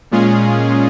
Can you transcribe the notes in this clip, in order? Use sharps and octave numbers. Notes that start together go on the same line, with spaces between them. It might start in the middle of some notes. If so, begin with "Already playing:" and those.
A#2 G#3 C#4 F4 G#4